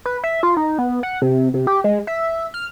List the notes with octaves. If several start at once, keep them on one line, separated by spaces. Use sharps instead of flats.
B4
E5
F4
D#4
B3
F#5
C3
C3
G4
G#3
E5
F6